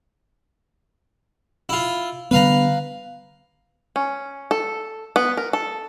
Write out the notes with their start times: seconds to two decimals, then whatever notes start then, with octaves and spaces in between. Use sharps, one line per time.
1.69 E4 F4
2.31 D3 G3 B3 B4 F5 A#5
3.96 C#4
4.51 A4
5.16 B3
5.37 A#4
5.53 A4